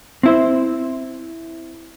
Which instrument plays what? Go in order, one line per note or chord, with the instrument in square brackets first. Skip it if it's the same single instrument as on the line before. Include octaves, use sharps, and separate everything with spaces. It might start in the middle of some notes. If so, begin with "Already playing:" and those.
[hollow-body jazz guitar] C4 E4 C5